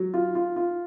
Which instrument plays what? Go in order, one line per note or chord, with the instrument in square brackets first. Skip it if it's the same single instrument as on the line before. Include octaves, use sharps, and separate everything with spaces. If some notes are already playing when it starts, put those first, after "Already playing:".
Already playing: [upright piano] F#3
F4
F4
F4